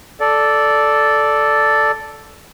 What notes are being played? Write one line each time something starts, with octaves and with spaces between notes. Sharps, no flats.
A4 D5